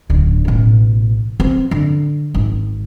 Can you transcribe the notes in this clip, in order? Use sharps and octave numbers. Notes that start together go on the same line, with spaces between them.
D1 D3
A1 B2
C4
D3
G#1